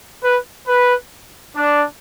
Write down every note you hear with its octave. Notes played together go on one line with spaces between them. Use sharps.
B4
B4
D4